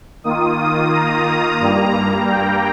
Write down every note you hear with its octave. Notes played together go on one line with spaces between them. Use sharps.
D#3 A#3 F4 D#6
D#6
A#5
G2 G3 A#3
G5